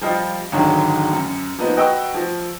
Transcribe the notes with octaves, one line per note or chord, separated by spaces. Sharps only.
F3 G3 F4 D#5
G1 E2 G#2 D3 D#3 F#3
F#2
F3 A#3 B3 D#4
F#4 B4 D#5 G5 C#6 E6
F3